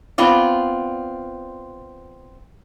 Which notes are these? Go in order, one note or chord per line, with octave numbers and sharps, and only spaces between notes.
B3 C4 F4 D5